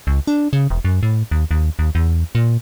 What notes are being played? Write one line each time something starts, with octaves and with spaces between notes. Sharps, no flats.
C#2
D4
C#3
E1
F#2
A2
D#2
D#2
D#2
E2
A#2